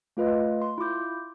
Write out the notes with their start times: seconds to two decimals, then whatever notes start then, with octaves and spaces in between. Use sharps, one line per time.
0.17 A3 F4 B4 D#5
0.62 C6
0.78 E4 F4 D6 G6